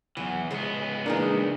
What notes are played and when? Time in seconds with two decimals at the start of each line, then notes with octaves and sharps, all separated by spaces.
0.17 E2 E3 F#3
0.51 C#2 B3 C#4 G#4
1.06 E3 G#3 A#3 D4 D#4 G#4